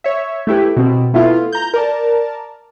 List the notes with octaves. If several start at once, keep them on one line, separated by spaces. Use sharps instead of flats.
C#5 E5
A3 E4 G4 B4
B2 C4
A3 B3 E4 F4
A#5 G6
A#4 D5 A5